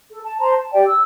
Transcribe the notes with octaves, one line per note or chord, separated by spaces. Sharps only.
A4
A5
C5 A5 A#5 C6
A5
G4 D5 G5
E6